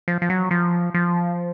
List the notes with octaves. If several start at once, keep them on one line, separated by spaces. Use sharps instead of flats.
F3
F3
F#3
F3
F3